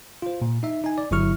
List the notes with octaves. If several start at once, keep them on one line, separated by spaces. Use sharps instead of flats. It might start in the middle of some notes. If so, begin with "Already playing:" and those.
F4 C5
A#2
D#4 E5
D#4 G#5
D5
G1 F#3 E4 C#6 F6